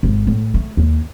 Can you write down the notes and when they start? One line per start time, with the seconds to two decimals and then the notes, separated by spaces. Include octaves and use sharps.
0.03 G#1
0.27 A2
0.54 A3
0.77 D#2